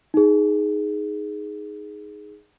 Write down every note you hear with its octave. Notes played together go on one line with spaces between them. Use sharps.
D#4 G#4